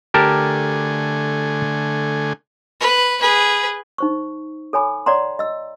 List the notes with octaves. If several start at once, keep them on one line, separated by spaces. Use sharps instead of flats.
D3 A3 G4 A#4 G#5 A5
B4
G#4 B4
D#4 C5 C#6
A4 C#5 G#5 B5 D6
C#5 D5 F#5 A#5 C6
D#5 E6